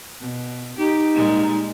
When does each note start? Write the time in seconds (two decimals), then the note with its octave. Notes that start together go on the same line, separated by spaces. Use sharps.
0.20 B2
0.78 D#4 G4
1.15 A#2 G3 G#3